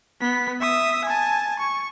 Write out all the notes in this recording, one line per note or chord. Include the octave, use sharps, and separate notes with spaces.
B3 B6
E5 D#6
G#5 A5
C#6